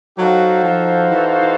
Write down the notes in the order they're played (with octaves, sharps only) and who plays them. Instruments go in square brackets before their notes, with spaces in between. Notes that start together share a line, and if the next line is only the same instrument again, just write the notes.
[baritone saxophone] F#3 [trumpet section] D#4 F#4 A4 C5 F5
[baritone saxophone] F3
E3
E3